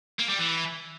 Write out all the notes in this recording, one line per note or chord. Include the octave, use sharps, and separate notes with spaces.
A#3
G3
E3